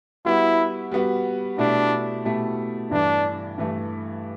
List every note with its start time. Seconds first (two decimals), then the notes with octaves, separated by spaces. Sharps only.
0.25 G3 B3 E4 F#4
0.92 G3 B3 F#4
1.58 B2 A3 D4 E4 G4
2.25 B2 A3 E4 G4
2.91 G2 E3 A3 D4
3.58 G2 E3 A3